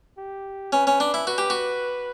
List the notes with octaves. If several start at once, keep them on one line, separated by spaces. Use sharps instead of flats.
G4
C#4 B4
C#4
D4
E4
F#4 B4
G4
F#4